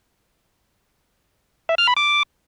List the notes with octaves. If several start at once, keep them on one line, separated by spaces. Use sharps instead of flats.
E5
F6
B5
D6